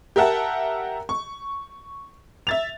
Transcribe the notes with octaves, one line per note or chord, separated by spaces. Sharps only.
G4 A#4 E5 F#5 A5
C#6
E5 A6 F7